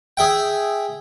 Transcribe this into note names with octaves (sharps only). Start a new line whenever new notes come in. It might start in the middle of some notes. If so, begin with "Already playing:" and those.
G#4 E5 G5